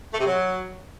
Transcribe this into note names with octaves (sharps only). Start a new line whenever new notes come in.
A3
C3
F#3